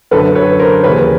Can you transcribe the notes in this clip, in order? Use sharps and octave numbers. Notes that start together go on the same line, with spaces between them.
F#2 D3 A4 B4
B4 C#5
A#4 C5
D#2 C#3 E3 B4 C#5